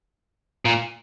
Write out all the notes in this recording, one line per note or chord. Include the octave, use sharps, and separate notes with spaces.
A#2